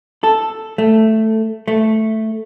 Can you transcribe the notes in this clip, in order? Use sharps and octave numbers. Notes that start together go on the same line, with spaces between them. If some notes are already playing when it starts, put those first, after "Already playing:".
A4
A3
A3